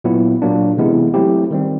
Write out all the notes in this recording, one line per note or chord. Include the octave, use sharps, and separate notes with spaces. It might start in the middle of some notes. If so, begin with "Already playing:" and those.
A#2 F#3 B3 E4
A#2 F#3 A#3 D4
C3 E3 G#3 B3 E4
F#3 A3 C4 E4 G4
D#3 G3 C4